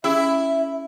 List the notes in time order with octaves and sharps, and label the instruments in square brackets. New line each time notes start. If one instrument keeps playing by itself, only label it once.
[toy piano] C#4 G#4 E6 [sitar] E4 [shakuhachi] E5